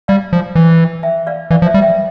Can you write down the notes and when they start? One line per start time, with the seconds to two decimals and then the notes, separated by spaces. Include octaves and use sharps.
0.08 G3 D5 F5
0.33 F3
0.55 E3
1.03 E5 G5
1.27 D5 F5
1.51 E3 D5 F5
1.62 F3
1.66 C5 E5
1.74 G3
1.82 E5 G5